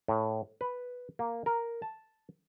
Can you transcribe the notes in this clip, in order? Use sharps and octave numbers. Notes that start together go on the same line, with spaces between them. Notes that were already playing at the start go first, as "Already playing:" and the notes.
A2
B4
A#3
A#4
A5